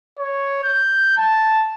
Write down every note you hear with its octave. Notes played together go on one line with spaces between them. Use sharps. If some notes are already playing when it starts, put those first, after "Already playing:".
C#5
G6
A5